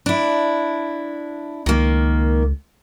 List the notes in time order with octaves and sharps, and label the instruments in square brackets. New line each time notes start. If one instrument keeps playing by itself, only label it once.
[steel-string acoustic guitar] D4 E4
[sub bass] C#2 [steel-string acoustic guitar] D#3 A#3